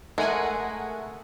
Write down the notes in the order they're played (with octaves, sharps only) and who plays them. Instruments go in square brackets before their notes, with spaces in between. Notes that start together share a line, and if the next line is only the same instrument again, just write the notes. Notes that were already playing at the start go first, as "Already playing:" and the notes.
[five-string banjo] G#3 [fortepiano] A3 [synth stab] A#4 F#5 G#5